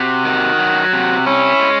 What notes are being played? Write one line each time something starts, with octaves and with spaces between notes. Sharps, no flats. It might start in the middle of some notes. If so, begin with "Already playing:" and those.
Already playing: C3 F#4
D#3
F#3
C3
C#4 E4
G#3